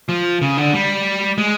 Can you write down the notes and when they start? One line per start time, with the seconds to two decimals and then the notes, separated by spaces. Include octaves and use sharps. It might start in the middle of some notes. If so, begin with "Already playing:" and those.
0.09 F3
0.41 C#3
0.57 D3
0.73 G3
1.38 G#3